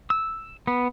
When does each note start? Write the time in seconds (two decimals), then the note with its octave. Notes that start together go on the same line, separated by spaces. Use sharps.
0.10 E6
0.67 B3